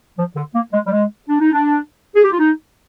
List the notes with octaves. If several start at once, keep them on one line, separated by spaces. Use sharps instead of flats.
F3
D3
A#3
G#3
G3
G#3
D4
D#4
D4
G#4
G4
F4
D#4